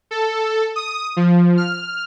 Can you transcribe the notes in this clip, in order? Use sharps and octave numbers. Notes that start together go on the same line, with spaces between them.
A4
D#6
F3
F6